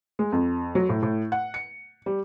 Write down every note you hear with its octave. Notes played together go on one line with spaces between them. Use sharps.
G#3
F2
F#3
A2
A2
F#5
C#7
G3